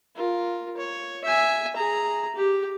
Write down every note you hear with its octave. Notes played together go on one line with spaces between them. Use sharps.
F4 A#4
C#5
E5 G#5
G#4 A#5
G4